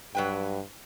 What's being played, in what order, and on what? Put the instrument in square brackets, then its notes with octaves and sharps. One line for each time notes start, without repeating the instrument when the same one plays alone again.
[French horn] G2 [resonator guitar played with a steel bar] F#3 B4 G5